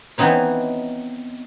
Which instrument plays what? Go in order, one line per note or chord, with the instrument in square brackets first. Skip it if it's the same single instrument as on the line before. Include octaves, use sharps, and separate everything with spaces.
[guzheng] E3 B3 C4 D#4 C#5